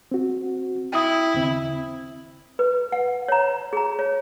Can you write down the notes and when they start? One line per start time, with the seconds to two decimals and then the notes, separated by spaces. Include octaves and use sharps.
0.11 C4 F#4
0.93 E4 G5 D#6
1.34 D#2 C#3 C4
2.59 B4
2.92 F#5
3.28 C#5 A#5
3.73 G#4 A#5
3.99 C#5